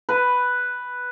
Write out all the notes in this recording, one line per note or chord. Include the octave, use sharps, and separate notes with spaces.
B4